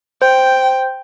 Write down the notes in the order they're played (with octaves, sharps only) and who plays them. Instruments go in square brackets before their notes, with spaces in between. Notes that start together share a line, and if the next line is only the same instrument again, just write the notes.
[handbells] C5 [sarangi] G5